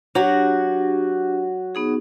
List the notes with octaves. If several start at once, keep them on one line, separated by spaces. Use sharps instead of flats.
F#3 D4 F#4 G4
B3 D#4 G#4